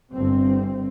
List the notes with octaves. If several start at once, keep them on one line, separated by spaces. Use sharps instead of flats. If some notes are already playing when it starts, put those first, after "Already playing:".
G1 C4